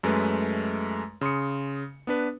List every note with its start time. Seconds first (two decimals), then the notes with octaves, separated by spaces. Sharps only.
0.03 F#2 G#3 A3 B4
1.21 C#3 C6 D#6 C#7
2.07 B3 D4 B4